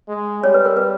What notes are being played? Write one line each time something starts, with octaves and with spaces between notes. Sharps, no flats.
G#3
G3 C#5
B4
A#4
B4